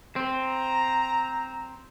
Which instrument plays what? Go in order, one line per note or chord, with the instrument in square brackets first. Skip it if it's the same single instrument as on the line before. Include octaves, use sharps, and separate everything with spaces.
[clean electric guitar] C4 [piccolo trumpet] A#5